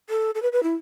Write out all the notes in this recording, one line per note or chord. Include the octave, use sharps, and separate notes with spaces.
A4
A4
B4
B4
E4